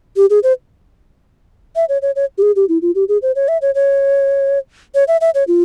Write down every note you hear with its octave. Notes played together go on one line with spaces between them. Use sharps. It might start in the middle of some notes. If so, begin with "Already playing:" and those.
G4
G#4
C5
E5
C#5
C#5
C#5
G4
G#4
G4
E4
F4
G4
G#4
C5
C#5
E5
C#5
C#5
C#5
E5
E5
C#5
F4